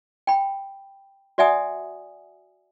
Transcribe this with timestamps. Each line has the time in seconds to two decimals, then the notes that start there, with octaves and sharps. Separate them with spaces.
0.27 G5 B5
1.38 F#4 D5 E5 F#5 G#5 D#6